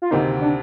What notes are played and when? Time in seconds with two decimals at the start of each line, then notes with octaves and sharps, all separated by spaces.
0.02 F4
0.11 D2 C3 D#3 A#3 D#4
0.41 D4